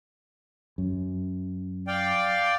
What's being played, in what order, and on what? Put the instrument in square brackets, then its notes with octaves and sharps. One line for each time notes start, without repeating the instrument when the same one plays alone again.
[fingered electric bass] F#2
[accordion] D5 F5 G5